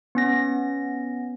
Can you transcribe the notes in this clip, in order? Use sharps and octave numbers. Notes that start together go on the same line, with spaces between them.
B3 C#4 A#6